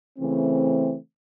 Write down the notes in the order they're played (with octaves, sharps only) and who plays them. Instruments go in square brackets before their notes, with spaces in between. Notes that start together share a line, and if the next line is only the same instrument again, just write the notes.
[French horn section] C#3 E3 A3 C4